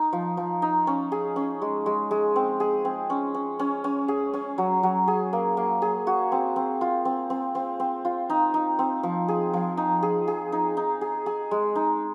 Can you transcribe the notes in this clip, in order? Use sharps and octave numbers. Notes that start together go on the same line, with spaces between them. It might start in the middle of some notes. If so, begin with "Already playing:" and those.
Already playing: D#4
F3
F3
D#4
C#4
G#4
C#4
G#3
G#3
G#3
C4
G#4
C4
C#4
C#4
C#4
C#4
G#4
C#4
F#3
F#3
G#4
A#3
A#3
G#4
F#4
C4
C4
F4
C4
C4
C4
C4
F4
D#4
D#4
C4
F3
G#4
F3
D#4
G#4
G#4
D#4
D#4
G#4
G#4
G#3
D#4